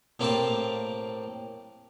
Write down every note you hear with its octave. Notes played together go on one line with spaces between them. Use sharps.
A2 A#3 C4 G4 F5 A5